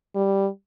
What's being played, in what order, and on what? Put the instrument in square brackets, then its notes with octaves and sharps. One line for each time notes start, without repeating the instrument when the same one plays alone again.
[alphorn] G3